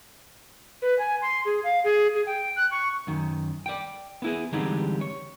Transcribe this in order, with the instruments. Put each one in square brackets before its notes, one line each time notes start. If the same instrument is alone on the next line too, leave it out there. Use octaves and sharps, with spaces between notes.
[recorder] B4
G#5
C6
G#4
F5
G#4
G#4
G5
F#6
C#6
[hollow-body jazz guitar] F#2 D#3
D5 G5
B3 E4 G#4
D3 E3 G3 G#3 C4 D#4
C#5